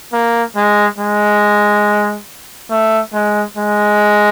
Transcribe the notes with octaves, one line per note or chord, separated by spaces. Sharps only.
A#3
G#3
G#3
A3
G#3
G#3